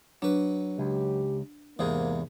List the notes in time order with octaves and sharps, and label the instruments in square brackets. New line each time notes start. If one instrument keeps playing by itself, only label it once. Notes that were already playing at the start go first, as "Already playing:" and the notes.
[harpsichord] F#3 B4 [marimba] D4
[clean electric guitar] C#2 [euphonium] G4
[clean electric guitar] E2 [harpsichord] G#2 C3 G#4 [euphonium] A#3